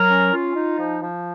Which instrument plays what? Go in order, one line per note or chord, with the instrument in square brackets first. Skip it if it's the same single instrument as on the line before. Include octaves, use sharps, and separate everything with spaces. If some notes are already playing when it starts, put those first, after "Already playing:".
Already playing: [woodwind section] F#3 [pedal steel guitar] A#4
[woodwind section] C#4
F4
D#4
F3
F3